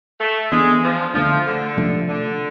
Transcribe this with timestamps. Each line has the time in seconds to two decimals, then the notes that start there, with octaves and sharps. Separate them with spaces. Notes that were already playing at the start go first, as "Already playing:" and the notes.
0.20 A3
0.52 E3 G#3 B3 D4
0.83 F3
1.14 D3 F3 A3 D4
1.46 D3
1.77 C3 F3 A3 D4
2.09 D3